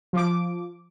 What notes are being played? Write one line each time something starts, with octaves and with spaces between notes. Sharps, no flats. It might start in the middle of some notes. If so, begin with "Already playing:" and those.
F3 D6